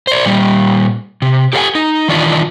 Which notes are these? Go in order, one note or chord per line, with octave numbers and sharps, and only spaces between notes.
C5 D5
A#2 G3
C3
G4 A4 C5 F5 F#5 G#5
D#4
D#3 E3 D4 D#4 F4